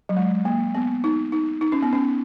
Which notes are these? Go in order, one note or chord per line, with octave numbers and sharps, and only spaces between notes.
F#3
G#3
A#3
B3
D#4
D#4
D#4
C#4
B3
C#4